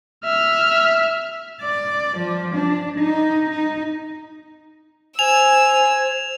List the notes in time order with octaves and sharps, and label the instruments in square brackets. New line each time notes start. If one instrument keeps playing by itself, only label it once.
[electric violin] E5 F6
[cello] D5
F3
D4
D#4
D#4
[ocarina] C5 [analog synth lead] G#5 [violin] E6 [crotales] F7